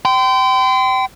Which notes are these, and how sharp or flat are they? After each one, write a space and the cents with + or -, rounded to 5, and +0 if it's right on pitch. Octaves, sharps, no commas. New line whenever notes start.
G5 -25 C6 -35